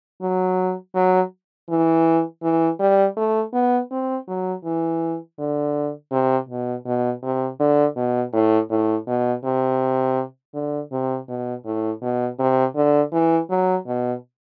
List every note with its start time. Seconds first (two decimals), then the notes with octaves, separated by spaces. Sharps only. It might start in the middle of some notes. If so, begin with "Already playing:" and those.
0.22 F#3
0.95 F#3
1.69 E3
2.43 E3
2.80 G3
3.17 A3
3.53 B3
3.91 C4
4.28 F#3
4.64 E3
5.39 D3
6.12 C3
6.49 B2
6.86 B2
7.23 C3
7.59 D3
7.96 B2
8.33 A2
8.70 A2
9.07 B2
9.44 C3
10.54 D3
10.92 C3
11.28 B2
11.65 A2
12.02 B2
12.39 C3
12.76 D3
13.12 E3
13.50 F#3
13.87 B2